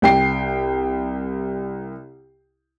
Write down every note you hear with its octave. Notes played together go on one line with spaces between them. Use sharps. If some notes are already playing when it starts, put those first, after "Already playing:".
C2 G5 C7